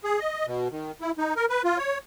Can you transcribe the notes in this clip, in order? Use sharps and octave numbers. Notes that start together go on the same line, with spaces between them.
G#4
D#5
B2
D#3
E4
D#4
A#4
B4
F4
C#5